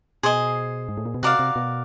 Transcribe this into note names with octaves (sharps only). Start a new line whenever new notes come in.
B2 G#4 C5 D#5 G#5
G#2
A2
A#2
B2
C3 F#4 A#4 D5 F5
C3
B2